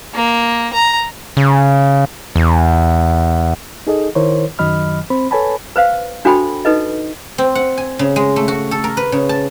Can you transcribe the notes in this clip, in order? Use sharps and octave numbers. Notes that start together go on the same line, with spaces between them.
A#3
A#5
C#3
E2
D#4 G#4 A4 D#5
D#3 E4 A#4 C5 C#5
F#2 D#3 F#3 D#5 B5 F6
C4 C5 B5
A4 B4 C#5 G#5 A5 B5
B4 C5 F5
D4 F#4 A4 C5 G5 B5
D#4 A4 B4 D#5
C4
F#5
G#5
C#3
G#3
A3
F#4
A4
A#4
B4
C#3
A5